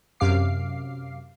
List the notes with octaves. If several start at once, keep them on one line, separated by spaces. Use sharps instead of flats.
F#2 C3 F5 D6 C7